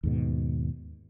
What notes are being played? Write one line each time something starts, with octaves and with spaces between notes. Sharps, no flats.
D#2 G#2 B2